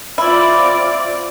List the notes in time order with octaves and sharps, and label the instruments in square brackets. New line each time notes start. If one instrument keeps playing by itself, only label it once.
[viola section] C4 F4 D5 [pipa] E4